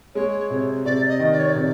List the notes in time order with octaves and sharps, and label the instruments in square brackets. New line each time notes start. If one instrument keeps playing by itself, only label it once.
[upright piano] G#3 [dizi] C#5
[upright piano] C3
[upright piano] C3 [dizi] D5
[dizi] D#5
[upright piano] D#3
[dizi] D5
C#5
D5
[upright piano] C3